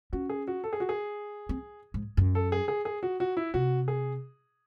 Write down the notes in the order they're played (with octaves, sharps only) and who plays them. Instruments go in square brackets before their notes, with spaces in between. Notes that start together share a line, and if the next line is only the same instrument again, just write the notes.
[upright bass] C#4 [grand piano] F#4
[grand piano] G#4
F#4
A4
G#4
F#4
G#4
[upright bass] C4
G#2
F#2
[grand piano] A4
G#4
G#4
G#4
F#4
F#4
E4
[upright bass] C3 [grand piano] F#4
[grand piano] G#4